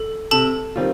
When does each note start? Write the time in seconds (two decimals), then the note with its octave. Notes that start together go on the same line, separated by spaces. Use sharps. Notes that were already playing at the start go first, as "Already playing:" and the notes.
Already playing: A4
0.31 C3 A4 A5
0.76 D#3 G3 C4 F4